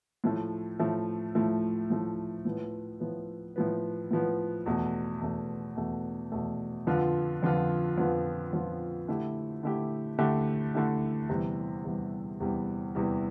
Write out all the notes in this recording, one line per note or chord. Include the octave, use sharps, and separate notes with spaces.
A2 F3 A3
A2 F3 A3
A2 F3 A3
A2 F3 A3
A2 F3 B3
A2 F3 B3
A2 F3 B3
A2 F3 B3
E2 B2 A3
E2 B2 A3
E2 B2 A3
E2 B2 A3
F2 D3 F3 B3 F4
F2 D3 F3 B3 F4
F2 D3 F3 B3 F4
F2 D3 F3 B3 F4
D3 A3 E4 G4
D3 A3 E4 G4
D3 A3 E4 G4
D3 A3 E4 G4
E2 C3 E3 G3
E2 C3 E3 G3
E2 C3 E3 G3
E2 C3 E3 G3